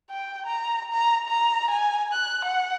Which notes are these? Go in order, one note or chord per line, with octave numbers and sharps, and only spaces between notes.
G5
A#5
A#5
A#5
G#5
F#6
F#5